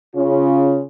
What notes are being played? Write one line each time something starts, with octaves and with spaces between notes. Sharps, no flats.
C#3 C#4 F4